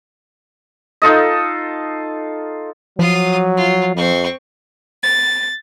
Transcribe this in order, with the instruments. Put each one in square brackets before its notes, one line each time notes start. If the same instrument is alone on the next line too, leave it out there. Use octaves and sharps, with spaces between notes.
[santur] D#4 F4 A4 D#5
[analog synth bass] F3 [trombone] F#3 [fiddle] F4 D#6
[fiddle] F4
[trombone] F2 [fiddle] C4 C#6
[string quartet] A6